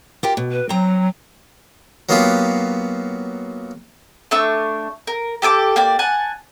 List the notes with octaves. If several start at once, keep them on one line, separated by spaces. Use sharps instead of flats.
F4 G4 A#4
B2
B4
F#3 C4 A#5
F#3 A#3 B3 D#4 F4 G4
A3 D4 C#6 E6
A#4
G4 A4 G#5 D6
A#3 G4 D5
F#5 G#5 A5